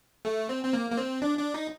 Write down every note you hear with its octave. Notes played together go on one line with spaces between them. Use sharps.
A3
C4
C4
A#3
A#3
C4
D4
D4
D#4